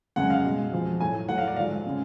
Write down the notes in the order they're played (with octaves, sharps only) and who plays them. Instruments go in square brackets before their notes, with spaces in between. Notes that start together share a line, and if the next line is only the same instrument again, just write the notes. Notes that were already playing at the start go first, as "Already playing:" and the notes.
[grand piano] F#2 C#3 G#3 F#5
F5
B2 G#3
F2 F3 G#3
A2 F#3 A3 G#5
A2 F#3 A3 F#5
F5
D5
G#2 F3 G#3 F5
C#3 G#3